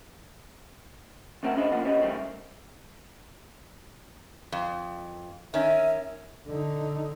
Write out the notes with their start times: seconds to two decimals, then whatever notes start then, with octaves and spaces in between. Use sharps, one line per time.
1.43 E2 A3 C4 A#4 E5 F#5
1.56 C#4 D4 G#4 B4 C5 D#5
1.71 D2 F3 A#3 D4 F#5
1.85 C#4 G4 B4 D#5
2.01 G2 C3 D#3 G3 A3 C4
4.52 F2
5.54 D#3 C#4 E5
6.47 D3 D#4